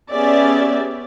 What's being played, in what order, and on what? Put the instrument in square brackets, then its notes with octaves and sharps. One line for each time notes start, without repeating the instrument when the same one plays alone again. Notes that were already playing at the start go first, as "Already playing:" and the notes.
[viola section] B3 C#4 G4 G#4 D5 E5